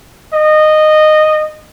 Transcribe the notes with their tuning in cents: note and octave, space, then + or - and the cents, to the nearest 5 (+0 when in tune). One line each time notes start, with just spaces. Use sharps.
D#5 -15